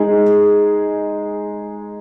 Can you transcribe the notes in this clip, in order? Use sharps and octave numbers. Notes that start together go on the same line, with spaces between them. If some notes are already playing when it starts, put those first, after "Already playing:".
Already playing: G#3 D#4 G#4